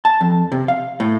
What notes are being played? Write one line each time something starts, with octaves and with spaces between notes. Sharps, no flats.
A5
F2
C3
F5
A2